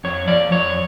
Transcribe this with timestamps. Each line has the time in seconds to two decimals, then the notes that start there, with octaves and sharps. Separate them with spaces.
0.04 F2 C#5
0.28 F3 D5
0.52 F2 C#5